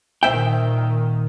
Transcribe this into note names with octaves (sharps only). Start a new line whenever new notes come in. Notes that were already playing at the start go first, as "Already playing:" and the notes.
A#2 D#3 C5 E5 G5